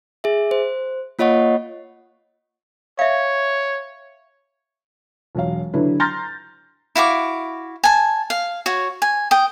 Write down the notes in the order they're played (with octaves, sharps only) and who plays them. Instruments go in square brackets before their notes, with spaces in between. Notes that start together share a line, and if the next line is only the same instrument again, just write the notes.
[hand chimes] G#4 E5
C5
A#3 F4 C#5 D#5 F#5 C#6
[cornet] C#5 [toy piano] E5 F5
[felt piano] E1 F#3 F5
D3 F#3 D4 E4 B4
A#5 C6 F6 G6 A6 A#6
[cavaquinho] E4 F#4 F5 D6
G#5 A5
F5
F#4 C#5
G#5
G5 D#6